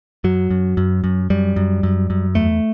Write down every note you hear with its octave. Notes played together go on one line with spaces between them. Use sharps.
F#2 F#3
F#2
F#2
F#2
F#2 G3
F#2
F#2
F#2
E2 A3